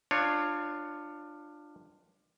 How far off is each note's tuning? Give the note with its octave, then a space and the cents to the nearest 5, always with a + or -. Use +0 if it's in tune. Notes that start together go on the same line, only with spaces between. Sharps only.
D4 +20 F4 +0 C#5 +0